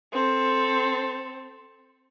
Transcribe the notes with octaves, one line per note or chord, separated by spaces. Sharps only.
C4 A4